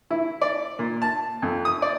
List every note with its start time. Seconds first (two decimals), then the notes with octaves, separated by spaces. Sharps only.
0.10 E4
0.41 D5
0.79 A#2
1.02 A5
1.42 F2
1.65 D#6
1.82 D5